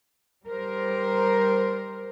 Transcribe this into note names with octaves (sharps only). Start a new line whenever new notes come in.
G3 A#4 C5